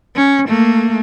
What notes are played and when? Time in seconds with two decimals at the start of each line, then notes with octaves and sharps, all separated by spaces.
0.16 C#4
0.48 A3 A#3